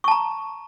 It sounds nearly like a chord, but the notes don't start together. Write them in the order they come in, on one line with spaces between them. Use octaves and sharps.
C#6 A5 A#5